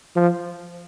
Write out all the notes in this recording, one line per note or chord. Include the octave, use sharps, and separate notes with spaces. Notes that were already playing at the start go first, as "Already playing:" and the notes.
F3